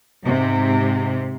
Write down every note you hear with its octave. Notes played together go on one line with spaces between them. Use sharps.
G#2 C3